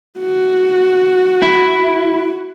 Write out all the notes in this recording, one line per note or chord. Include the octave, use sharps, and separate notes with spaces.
F#4
E4